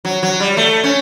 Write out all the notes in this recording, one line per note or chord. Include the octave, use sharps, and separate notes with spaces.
F#3
F#3
G3
A3
C#4